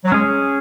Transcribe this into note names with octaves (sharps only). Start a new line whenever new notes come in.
F#3
G#3 C#4 G#4